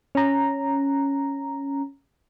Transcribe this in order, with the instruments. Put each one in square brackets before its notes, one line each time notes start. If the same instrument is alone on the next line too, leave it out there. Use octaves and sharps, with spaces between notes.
[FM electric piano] C#4 A#5